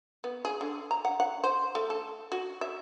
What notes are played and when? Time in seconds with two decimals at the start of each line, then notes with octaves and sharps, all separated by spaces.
0.24 B3
0.45 G#4
0.61 D3
0.91 A#5
1.05 F#5
1.20 F#5
1.44 C5
1.75 A3
1.90 A4
2.32 F#4
2.61 E5